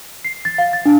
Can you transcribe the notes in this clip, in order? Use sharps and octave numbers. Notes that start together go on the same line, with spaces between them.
C7
A6
F5
A6
D4